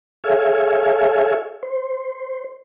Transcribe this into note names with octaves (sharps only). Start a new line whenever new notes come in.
G#4 A4 C#5 E5 F5 G#5
C5